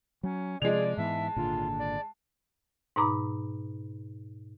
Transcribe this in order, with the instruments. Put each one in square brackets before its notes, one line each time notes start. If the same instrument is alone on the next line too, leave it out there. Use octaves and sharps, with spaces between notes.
[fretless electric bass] F#3 [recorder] C#4
[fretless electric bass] C3 F3 [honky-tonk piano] G#3 F7 [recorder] G#4 [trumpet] D5
[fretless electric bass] G#2 E3 B3 [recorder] E5 [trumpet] A5
[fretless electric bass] G#1 A#2 D3 [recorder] F4
[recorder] D5
[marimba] G#2 B2 D#4 A#5 B5 D6